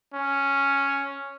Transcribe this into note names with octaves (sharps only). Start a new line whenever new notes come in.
C#4